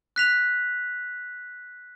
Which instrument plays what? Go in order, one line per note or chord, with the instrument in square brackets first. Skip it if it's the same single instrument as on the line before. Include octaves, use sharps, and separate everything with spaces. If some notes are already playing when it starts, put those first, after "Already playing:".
[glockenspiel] F#6 B6 F7